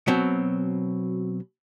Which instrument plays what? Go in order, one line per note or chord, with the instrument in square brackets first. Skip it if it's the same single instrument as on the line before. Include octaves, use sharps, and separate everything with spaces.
[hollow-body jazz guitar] B2 F#3 C4